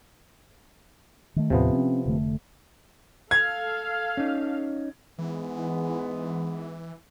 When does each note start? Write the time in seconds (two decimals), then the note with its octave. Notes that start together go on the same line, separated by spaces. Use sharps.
1.36 D#3 A3
1.50 D#2 A2 C3 F3 B3
1.73 C4 C#4
2.06 F1 D3 A3
3.31 A4 F5 G#6
4.17 C#4 D#4
5.19 G#2 E3 G#3 B3